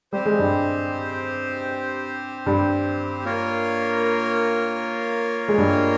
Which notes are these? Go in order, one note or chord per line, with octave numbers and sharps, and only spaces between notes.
G3 C4 G4 C5
G#3
G2 G3
G2 G3
A#3 F4 A#4 C#5
G#3
G2 G3